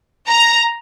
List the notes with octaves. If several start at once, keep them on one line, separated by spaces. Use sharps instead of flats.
A#5